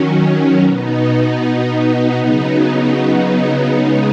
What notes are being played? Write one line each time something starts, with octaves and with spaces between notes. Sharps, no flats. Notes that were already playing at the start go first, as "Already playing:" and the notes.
Already playing: D#3 F#3 C#4
B2 B3 D#4
C#3 F#3 B3 D#4
C#3 G#3 B3 D#4